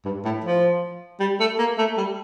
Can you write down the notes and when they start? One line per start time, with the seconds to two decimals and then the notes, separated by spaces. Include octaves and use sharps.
0.05 G2
0.25 A2
0.44 F3
1.20 G3
1.40 A3
1.59 A#3
1.78 A3
1.97 G3